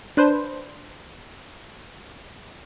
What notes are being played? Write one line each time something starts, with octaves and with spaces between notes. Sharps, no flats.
D4 B4 C5